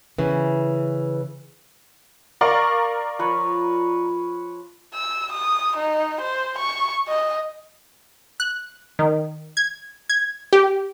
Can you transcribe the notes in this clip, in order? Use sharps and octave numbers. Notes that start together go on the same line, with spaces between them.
C#3 E3
A#4 D5 F5 C#6
F3 B4 C#5
E6
D#6
D#4
C5
C#6
D#5
F#6
D#3
G#6
G#6
G4